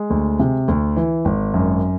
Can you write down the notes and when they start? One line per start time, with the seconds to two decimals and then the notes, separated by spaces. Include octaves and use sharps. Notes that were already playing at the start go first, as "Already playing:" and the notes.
Already playing: G#3
0.10 D2
0.40 C3
0.68 D2
0.97 E3
1.25 G#1
1.54 F#2